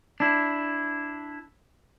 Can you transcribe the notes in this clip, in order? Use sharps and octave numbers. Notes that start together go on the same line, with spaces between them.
D4 E4